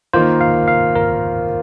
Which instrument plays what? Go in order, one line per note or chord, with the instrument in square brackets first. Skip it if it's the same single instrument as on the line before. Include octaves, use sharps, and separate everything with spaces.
[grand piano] D#3 A#3 F4 [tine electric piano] C5
[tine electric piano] F5
F5
A#4